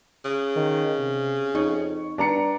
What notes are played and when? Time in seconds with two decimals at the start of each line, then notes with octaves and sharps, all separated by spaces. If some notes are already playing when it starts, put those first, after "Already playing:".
0.25 C#3
0.56 D#3
0.98 C3
1.55 F2 D#4 C#5
2.18 G2 D4 A#5 C#7